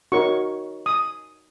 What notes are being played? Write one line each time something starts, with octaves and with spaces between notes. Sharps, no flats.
D#4 F#4 A#4 C#5 C#6
D#6